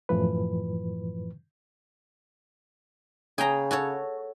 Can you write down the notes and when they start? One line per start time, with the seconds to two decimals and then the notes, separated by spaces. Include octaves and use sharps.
0.09 F#2 A2 E3 F3 B4
3.38 C#3 G#4 G5 A#5
3.71 F#4 A4 C#5